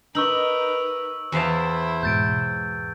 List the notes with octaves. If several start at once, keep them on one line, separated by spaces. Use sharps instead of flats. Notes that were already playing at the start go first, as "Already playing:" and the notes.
D#4 A#4 B4 C#6 E6 F#7
E2 E4 C5 F5 A5
G#2 B2 G6 A6 D7